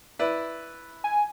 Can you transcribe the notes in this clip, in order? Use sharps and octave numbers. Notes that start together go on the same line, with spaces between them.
E4 B4 D5
G#5